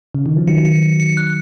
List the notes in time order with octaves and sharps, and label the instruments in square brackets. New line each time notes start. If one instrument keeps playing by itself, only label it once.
[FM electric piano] C#3
D#3
F3
[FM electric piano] D#3 F#3 [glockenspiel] C#7
[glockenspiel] C#7
C#7
C#7
F#6